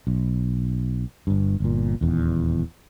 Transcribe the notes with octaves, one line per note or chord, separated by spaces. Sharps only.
B1
G1 G2
G1 A#2
D#1 E2